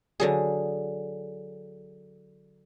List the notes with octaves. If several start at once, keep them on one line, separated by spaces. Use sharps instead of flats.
D3 F#3 G#4